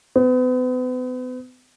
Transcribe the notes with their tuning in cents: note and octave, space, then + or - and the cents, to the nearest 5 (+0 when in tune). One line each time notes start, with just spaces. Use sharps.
B3 +40